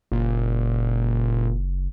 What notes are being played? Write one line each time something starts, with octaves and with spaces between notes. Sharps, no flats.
F#1 A#2